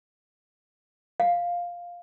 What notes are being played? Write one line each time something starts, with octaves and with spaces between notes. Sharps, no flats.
F5